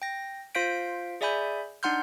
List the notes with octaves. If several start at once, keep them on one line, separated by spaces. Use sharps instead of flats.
G5 A#6
F4 C5 F5 G6 B6 D7
G#4 D5 E5 G#5 B5 G6
D4 D#4 F#5 C6 F6 G6